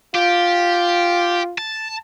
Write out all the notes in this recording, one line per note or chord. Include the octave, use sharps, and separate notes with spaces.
F4 G4
A5